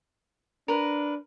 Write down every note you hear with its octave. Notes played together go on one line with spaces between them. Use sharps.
D4 A#4 B4